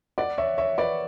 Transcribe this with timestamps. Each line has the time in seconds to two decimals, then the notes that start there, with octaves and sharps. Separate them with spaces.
0.18 D5 F#5
0.38 C#5 E5
0.58 C#5 E5
0.78 B4 D5